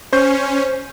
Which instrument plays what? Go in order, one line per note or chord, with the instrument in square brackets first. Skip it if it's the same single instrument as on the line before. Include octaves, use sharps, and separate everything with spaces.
[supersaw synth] C#4 [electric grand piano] C5 C#6 G6